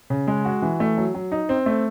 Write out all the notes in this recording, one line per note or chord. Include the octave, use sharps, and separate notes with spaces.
C#3
G#3
F#4
E3
A3
F#3
F#3
D#4
C4
A3